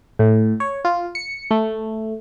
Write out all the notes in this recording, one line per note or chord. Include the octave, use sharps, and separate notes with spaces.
A2
C#5
F4
C#7
A3